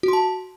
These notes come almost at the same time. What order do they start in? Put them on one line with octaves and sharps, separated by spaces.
F#4 C6 A5